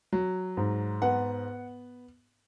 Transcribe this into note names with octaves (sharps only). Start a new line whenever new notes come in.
F#3
G#2
B3 F#5